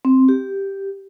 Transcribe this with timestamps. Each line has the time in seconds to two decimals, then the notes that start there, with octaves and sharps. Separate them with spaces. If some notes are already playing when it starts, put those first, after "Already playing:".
0.05 C4
0.29 G4